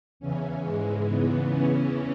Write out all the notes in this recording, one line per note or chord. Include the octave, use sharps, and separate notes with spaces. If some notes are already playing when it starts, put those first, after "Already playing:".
E2 C#3 E3 C#4
G#2 E3 G#3
E2 C#3 E3 B3
E2 C#3 E3 C#4